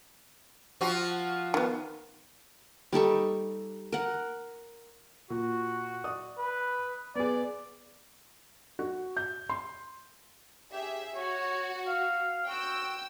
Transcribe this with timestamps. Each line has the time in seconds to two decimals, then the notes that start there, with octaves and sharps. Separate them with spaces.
0.81 F3 F4 F#4
1.54 D#3 B3
2.92 G3 D#4 A4 C#6
3.92 A#4 F#5
5.30 A#2 F#4
6.04 D5 D#6
6.38 B4
7.15 B3 G#4 D5
8.79 F#4
9.17 G6
9.50 C6
10.72 G4 G#4 E5
11.15 F#4 C#5
11.87 F5
12.48 F#4 G5 E6